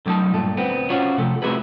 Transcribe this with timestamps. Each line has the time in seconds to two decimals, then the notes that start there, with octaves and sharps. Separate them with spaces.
0.06 D3 F#3 A3 D#4 A5
0.34 G2 A#2 A3
0.57 D2 B3 C4
0.90 C#4 F4 F#4 C5 C#5
1.18 C3 F3 A3
1.42 A3 C4 E4 F#4 G#4 B4